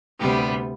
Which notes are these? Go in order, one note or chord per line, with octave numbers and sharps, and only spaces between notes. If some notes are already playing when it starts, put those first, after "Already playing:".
D2 C3 G3 B3 G4